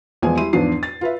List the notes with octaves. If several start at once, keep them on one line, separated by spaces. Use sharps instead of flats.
E2 F3 G#3 F4 G#5
G3 E4 C6 D#7
E2 G#2 F3 D4 C7
A6
F4 B4 E5